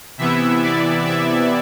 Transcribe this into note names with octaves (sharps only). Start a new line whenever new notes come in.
C3 E3 B3 E4 E5
D5
E5